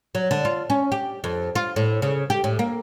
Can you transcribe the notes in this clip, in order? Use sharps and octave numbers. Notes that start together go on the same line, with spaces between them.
F#3
D3
F4
C#4
G4
F2
F4
A2
C#3
G4
A2
A#3